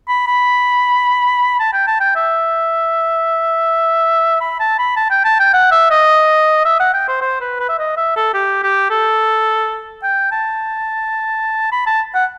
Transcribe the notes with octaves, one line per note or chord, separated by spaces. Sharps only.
B5
B5
A5
G5
A5
G5
E5
B5
A5
B5
A5
G5
A5
G5
F#5
E5
D#5
E5
F#5
G5
C5
C5
B4
B4
E5
D#5
E5
A4
G4
G4
A4
G5
A5
B5
A5
F#5